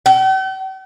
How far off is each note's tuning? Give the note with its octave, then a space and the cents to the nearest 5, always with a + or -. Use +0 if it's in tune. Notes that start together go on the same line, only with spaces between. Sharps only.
G5 -45